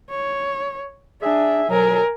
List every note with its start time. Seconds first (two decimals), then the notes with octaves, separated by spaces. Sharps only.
0.10 C#5
1.22 D4 G#4 E5
1.70 F2 B2 F#3 A#4 G#5